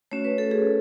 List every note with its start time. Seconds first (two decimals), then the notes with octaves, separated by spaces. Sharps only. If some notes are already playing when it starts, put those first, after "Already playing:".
0.11 A3 C#4 F#4 C#5
0.25 B4
0.38 A4
0.51 G#4